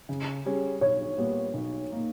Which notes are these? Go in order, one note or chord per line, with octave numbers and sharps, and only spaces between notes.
C#3
G3 C#4 G#4
B1 C#5
A#2 G3 B3
B1
A#2 A#3 D#4